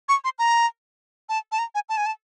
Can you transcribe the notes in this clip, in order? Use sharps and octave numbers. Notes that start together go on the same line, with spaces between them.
C#6
C6
A#5
A5
A5
A#5
G#5
A5
G#5
A5